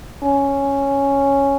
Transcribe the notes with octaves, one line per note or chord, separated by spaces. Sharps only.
C#4